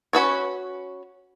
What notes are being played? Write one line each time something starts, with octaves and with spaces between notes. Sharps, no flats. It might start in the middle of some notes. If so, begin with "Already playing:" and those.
C#4 F#4 B4 C#5